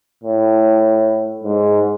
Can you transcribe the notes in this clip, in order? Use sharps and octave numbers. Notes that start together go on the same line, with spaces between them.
A2
G#2